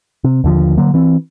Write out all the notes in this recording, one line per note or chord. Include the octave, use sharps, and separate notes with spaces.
C3
D#2 D3 F3
D3 F#3 A#3
E3 C4